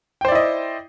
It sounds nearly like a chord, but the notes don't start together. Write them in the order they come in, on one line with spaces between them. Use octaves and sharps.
G5 C5 D5 E4 D#5